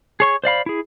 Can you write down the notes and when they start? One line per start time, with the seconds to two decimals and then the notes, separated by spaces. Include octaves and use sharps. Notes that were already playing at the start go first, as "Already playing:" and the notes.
0.20 G#4 C#5 C#6
0.44 C5 D5 F5 B5
0.66 E4 G#4